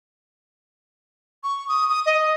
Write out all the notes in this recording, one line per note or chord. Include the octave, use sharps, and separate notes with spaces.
C#6
D#6
D#6
D#5